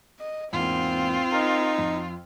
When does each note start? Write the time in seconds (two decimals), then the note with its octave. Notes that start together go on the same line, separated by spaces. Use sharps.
0.19 D#5
0.53 E2 G#2 A#3 C4 F4
1.32 D#4 A#4 F6 C7
1.78 F2